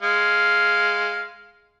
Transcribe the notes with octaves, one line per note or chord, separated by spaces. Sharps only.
G#3 F5